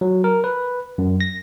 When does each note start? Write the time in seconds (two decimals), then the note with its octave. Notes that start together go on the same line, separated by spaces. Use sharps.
0.01 F#3
0.24 A#4
0.44 B4
0.98 F#2
1.21 A#6